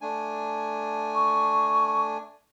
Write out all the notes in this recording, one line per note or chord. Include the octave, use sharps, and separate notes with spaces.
A3 D4 G#5
C#6